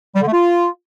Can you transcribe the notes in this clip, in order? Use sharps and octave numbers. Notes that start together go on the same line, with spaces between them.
G3
D3
A3
F4